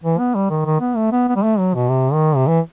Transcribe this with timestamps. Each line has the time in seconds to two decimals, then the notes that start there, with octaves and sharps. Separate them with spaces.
0.04 E3
0.19 B3
0.35 G3
0.50 D#3
0.65 D#3
0.80 B3
0.96 A3
1.12 B3
1.28 B3
1.36 G3
1.43 A3
1.59 F#3
1.75 B2
1.89 C3
2.13 D#3
2.36 C3
2.47 E3